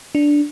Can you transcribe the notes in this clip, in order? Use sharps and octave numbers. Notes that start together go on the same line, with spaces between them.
D4